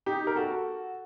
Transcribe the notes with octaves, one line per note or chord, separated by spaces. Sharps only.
D#4 G4
A#4
F#4 A4